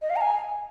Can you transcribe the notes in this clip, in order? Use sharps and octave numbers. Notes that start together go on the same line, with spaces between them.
D#5
F5
A#5
G#5